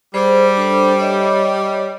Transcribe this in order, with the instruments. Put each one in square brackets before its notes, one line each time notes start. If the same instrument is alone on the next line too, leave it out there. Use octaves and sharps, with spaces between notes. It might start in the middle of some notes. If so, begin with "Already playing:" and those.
[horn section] G3 [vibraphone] G#4 C5
[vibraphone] D4 A4 C5
C#5 D#5 E5